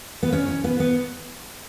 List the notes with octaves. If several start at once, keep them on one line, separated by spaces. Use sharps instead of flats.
B3
C#4
C#4
B3
B3